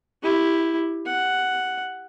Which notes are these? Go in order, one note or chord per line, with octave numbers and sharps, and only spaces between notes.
E4 G4
F#5